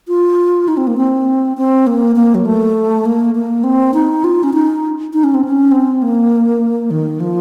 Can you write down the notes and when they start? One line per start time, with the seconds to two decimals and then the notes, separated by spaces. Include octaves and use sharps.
0.08 F4
0.68 D#4
0.77 C4
0.87 A#3
0.97 C4
1.57 C4
1.87 A#3
2.16 A#3
2.35 F#3
2.45 A3
3.06 A#3
3.35 A#3
3.64 C4
3.94 D#4
4.24 F4
4.43 C#4
4.54 D#4
5.13 D#4
5.24 C#4
5.34 C4
5.45 C#4
5.72 C4
6.02 A#3
6.91 D#3
7.20 F3